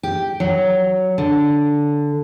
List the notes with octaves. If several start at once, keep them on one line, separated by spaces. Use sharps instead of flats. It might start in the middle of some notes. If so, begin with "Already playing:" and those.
G4
F#3
D3